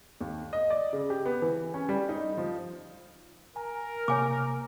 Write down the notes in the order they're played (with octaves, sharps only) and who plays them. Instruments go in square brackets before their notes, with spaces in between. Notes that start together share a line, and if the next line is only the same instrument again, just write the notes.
[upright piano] D#2
D#5
D5
C#3
G4
B3
E3
C#4
G3
D#4
F3
[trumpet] A#4 [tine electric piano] G#5 A#5
[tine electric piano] C3 A#3 [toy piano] C#5 G#5 D6